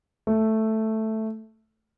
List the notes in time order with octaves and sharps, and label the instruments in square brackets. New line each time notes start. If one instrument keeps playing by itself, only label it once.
[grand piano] A3